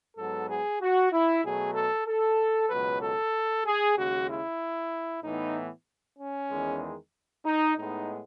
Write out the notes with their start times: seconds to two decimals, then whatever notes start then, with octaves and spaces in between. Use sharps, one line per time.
0.17 G#2 F#3 B3 A4
0.48 G#4
0.81 F#4
1.12 E4
1.43 B2 F#3 A3 G#4
1.75 A4
2.07 A4
2.70 C#2 B2 F#3 B4
3.02 A4
3.65 G#4
3.96 D#2 C#3 G#3 F#4
4.29 E4
5.24 A2 E3 B3 D#4
6.18 C#4
6.50 E2 D#3 G#3
7.45 D#4
7.77 A2 G#3 B3 D#4